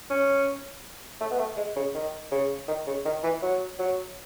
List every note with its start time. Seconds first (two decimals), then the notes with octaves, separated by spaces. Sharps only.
0.10 C#4
1.21 A3
1.31 B3
1.39 A3
1.57 G#3
1.76 C#3
1.95 D#3
2.32 C#3
2.68 D#3
2.87 C#3
3.06 D#3
3.23 E3
3.42 F#3
3.79 F#3